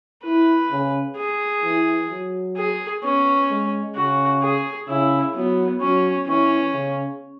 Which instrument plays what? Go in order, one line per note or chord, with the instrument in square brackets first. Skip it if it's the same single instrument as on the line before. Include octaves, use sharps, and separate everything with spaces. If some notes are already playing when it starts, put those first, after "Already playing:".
[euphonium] E4 [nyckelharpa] B4
[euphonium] C#3
[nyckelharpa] G#4
[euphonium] E3
F#3
[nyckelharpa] G#4
[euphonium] B3 [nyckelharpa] C#4
[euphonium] G#3
[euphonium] C#3 [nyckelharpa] F#4
[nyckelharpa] G#4
[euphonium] C#3 [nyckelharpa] E4
[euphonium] F#3 [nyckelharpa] B3
[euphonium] F#3 [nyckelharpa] C#4
[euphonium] E3 [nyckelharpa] C#4
[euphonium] C#3